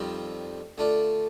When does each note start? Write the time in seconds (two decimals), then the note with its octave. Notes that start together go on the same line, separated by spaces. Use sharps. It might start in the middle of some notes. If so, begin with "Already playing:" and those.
Already playing: F2 D#3 G3 C4 F4
0.78 D3 A3 D4 F4